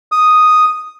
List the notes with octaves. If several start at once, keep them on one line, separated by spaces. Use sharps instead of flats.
D#6